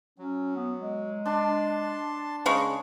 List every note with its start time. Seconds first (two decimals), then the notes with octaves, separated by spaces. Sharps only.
0.18 F#3 C#4
0.56 B3
0.79 G#3
1.26 D4 A5 C6
2.46 C#3 G#3 G#4 C#6